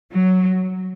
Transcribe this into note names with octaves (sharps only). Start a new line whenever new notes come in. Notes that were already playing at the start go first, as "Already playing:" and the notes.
F#3